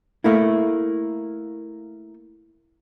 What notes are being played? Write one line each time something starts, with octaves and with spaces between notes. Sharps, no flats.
A3 A#3 E4